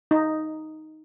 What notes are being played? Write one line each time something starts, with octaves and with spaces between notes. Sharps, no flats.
D#4